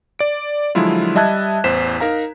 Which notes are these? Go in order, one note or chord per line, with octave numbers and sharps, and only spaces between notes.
D5 D7
D3 F3 F#3 G#3 E4 F4
G3 D#5 E5 A5 F#6 G#6
A1 E2 C5 B6 E7
D#4 A#4 F5 A#5